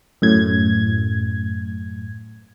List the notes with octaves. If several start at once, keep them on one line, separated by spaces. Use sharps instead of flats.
F#2 A2 G#6